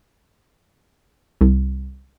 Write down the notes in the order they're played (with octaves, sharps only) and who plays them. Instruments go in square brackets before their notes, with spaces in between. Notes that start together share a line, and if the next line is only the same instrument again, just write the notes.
[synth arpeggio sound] C2